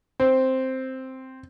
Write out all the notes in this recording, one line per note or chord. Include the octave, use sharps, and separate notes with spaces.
C4